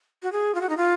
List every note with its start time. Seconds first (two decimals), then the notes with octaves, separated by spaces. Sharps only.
0.23 F#4
0.32 G#4
0.55 F4
0.61 F#4
0.69 D#4
0.77 F4